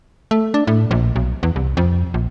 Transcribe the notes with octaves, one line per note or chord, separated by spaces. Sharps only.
A3
D4
A2
A#1
B1
E2
C2
F2
A#1